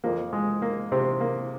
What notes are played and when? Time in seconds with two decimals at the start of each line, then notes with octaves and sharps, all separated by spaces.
0.04 F2 F3 A#3
0.33 G#3
0.62 A#3
0.92 C3 C4
1.21 A#3